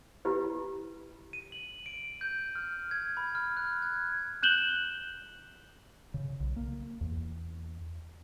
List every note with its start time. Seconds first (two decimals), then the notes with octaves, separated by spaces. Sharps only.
0.25 E4 F4 G4 B4
1.33 D#7
1.52 F#7
1.86 D7
2.21 G6
2.55 F6
2.91 G#6
3.17 B5
3.35 F6
3.57 F#6
3.82 G#6
4.43 F#6 G6 E7 F#7 G7
6.14 C#3
6.40 B1
6.56 A#3
7.01 E2